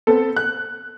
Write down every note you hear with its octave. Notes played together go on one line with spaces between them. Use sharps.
B3 C4 A4
F#6